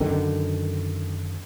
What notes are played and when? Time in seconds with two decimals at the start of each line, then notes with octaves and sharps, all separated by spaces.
0.01 F#2 D3 D#3